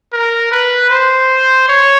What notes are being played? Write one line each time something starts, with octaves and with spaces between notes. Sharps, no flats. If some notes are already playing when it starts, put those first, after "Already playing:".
A#4
B4
C5
C#5